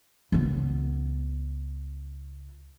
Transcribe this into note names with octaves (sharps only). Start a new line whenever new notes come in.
C#2 B3